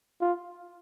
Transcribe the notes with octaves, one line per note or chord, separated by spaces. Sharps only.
F4